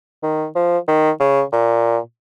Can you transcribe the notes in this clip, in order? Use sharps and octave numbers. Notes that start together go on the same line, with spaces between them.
D#3
F3
D#3
C#3
A#2